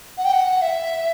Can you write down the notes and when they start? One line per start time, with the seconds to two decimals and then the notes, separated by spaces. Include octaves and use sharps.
0.18 F#5
0.25 G5
0.33 F#5
0.62 E5